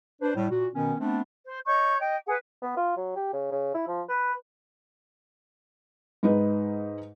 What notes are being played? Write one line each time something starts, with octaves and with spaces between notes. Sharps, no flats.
D4 B4 C5
A2 G3
A#2 F#4
B2 D#3 B3 C#4
A3 B3 C4 D4
C5
C#5 D#5 C#6 G6
D#5 G5
G#4 B4 F#5
B3
F4
F#3
G4
C#3
C#3
E4
F3
B4
G#2 D#4 B4